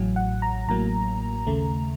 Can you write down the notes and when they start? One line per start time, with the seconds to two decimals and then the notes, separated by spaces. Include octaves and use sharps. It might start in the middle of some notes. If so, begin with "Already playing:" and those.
Already playing: A1 A2 F#3
0.16 F#5
0.42 A#5
0.68 A1 A2 F#3 A#3 A#5
1.47 D#2 C#3 A3